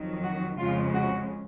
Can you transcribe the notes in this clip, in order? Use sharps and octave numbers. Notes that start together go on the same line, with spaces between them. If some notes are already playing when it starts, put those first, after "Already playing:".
Already playing: F2 D#3 F#3
F#4
F2 C#3 G#3 F4
F#4